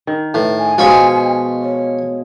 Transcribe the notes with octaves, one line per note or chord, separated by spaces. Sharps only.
D#3
A2 B4
G#5
B2 F3 G#3 F4 B5 C#6
C#5